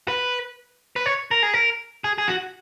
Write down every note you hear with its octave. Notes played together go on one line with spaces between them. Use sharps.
B4
B4
C#5
A#4
G#4
A#4
G#4
G#4
F#4